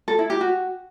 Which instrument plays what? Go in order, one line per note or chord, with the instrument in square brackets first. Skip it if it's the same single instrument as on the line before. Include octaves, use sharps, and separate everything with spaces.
[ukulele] A4
E4
G4
F#4